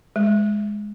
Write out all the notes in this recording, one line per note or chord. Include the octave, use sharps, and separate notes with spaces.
G#3